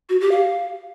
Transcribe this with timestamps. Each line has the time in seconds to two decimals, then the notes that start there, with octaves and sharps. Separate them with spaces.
0.10 F#4
0.21 G4
0.32 F5